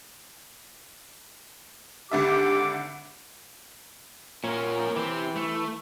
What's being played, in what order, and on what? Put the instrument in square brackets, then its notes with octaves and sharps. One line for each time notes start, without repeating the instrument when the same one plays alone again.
[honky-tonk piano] G#1 D3 E5 [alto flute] G4 [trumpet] D6
[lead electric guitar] A#2 [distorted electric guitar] C#4 A#4
[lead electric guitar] E3 [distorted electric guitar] C4 G4
[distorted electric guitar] A3